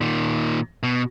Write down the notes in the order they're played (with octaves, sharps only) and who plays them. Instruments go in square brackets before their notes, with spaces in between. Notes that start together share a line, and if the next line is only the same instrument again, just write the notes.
[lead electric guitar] A#2 D#3
B2